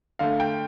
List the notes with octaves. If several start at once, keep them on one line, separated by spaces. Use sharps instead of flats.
D3 A3 F5
G5